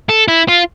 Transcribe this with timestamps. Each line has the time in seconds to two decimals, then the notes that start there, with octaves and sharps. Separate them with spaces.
0.09 A4
0.28 E4
0.48 F4